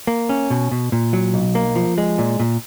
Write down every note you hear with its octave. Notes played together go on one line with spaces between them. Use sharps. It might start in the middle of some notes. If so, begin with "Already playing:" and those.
A#3
C#4
B2
B2
A#2
F#3
B1
A#3
F3
G#3
A#2
A#2